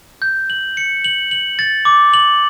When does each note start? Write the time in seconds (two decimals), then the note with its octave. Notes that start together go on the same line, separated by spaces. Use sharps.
0.22 G6
0.50 F#7
0.77 C#7
1.05 F#7
1.31 F#7
1.59 A6
1.85 D6
2.14 F#7